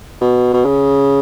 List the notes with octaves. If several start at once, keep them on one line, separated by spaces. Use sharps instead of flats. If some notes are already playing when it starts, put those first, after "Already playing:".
B2
B2
C#3